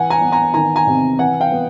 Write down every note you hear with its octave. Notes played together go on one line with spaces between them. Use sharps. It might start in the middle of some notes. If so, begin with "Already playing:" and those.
Already playing: E3 F#5 G#5
G#5 A#5
B3
G#5 A#5
D#3 G#5 A#5
G#5 A#5
C3
E3 F#5 G#5
F5 G5
B3